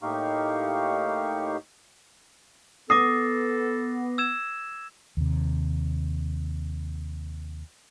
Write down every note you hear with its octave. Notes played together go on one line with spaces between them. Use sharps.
A2 A#3 D#4 G4 F5 C#6
B3 A4 D6 D#6 A#6 C7
E6 G#6 E7
D#2 C3